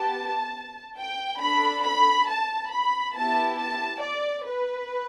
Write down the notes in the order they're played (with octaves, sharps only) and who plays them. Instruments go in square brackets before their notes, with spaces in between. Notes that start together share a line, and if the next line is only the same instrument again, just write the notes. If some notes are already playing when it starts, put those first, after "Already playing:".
Already playing: [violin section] B3 G4 A5
G5
D4 A4 B5
B5
A5
B5
B3 E4 G4 A5
A5
D5
B4